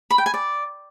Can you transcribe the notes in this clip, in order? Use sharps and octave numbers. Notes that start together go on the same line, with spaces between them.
B5
G5
G#5
D5